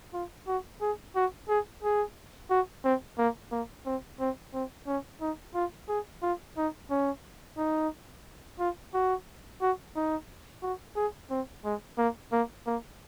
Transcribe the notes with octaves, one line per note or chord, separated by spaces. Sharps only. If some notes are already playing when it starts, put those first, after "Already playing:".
F4
F#4
G#4
F#4
G#4
G#4
F#4
C4
A#3
A#3
C4
C4
C4
C#4
D#4
F4
G#4
F4
D#4
C#4
D#4
F4
F#4
F#4
D#4
F#4
G#4
C4
G#3
A#3
A#3
A#3